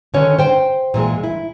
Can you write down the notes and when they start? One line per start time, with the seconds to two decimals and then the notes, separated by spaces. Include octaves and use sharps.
0.14 D3 D#3 C#4 C#5
0.39 C5 G5
0.94 A#2 E3 G#3
1.24 E4